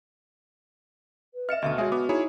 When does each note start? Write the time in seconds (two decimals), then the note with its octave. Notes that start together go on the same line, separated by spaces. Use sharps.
1.34 B4
1.49 D#5 E5 F6 C#7 E7
1.62 D2 B2 D3 D#5 E5 A5
1.78 G#3 F#4 G#4 C#5 E5
1.92 B3 D6
2.09 D#4 E4 G#4 C#5 A#5